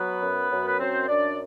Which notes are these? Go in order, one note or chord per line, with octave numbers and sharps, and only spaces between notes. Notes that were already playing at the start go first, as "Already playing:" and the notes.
Already playing: F#3 B3 B4
F#2
F#2
B4
F#2 C4 C5
C5
F#2 D4 D5